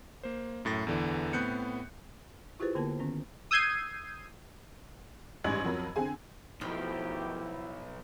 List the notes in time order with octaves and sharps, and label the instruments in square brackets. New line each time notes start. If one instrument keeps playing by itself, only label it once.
[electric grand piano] A#3 C5
F#2 A2 A6 A#6
E2 D3 E3
A2 B3 C4 F#6 G6 C#7
[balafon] E4 F4 G4 G#4 B4 C5
D3 A#3 B3 A#4 A5
D#3 B3 C#4
[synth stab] D#6 E6 G6 G#6 C7 D#7
[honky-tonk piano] A1 G#2 G3 G#5 G#6 F#7
F2 F#3 A#4 B5
D3 C4 G#4 G#5
[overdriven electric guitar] B1 [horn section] D#3 A3 G4 [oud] F3 [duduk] E4